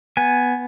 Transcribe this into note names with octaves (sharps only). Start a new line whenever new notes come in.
B3 G#5